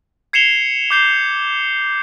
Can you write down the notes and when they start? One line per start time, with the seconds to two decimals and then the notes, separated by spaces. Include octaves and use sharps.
0.33 G#6 C7 C#7 E7 F7 G7
0.91 D6 G6 C7 G7